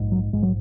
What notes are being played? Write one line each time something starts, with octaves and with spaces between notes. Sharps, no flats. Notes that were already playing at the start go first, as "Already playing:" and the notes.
Already playing: A#1 G#2
F#3
A#1 G#2 G#3
F#3